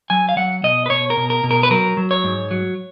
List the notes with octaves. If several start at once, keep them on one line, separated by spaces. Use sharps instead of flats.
F#3 G#5
F5
F#3 F#5
B2 D#5
B4
B2 C#5
A#4
B2
A#4
B2
A#4
B4
F#3 A#4
F#3
C#5
G#2
F#3